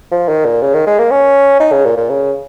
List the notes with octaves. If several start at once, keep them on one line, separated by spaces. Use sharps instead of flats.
F3
D#3
A#2
C#3
D#3
G#3
A#3
C#4
D#4
C#3
A#2
A#2
C#3